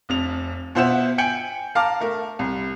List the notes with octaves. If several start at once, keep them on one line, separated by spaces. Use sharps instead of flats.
F1 F2 F7
B2 F4 C5 E5 F#5 E7
G5 G#5 G6 C#7 D7 F#7
F5 A5 A#5 D6 F6
A3 A#4
C2